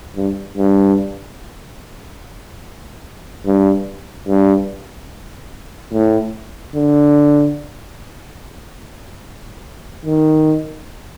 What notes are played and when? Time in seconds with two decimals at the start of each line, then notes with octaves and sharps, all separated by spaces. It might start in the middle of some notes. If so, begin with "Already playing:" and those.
0.17 G2
0.58 G2
3.46 G2
4.28 G2
5.93 A2
6.76 D3
10.05 D#3